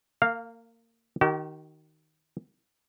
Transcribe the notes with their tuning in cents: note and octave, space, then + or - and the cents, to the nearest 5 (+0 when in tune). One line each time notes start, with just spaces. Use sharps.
A#3 -25 F5 +0
D#3 +0 G4 -45